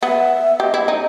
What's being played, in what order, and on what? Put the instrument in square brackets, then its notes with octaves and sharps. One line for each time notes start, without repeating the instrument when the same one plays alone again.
[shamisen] B3 [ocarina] E5
[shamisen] G4 [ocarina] D#5
[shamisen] E4
D#4